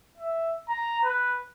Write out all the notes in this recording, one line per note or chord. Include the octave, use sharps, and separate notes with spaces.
E5
A#5
B4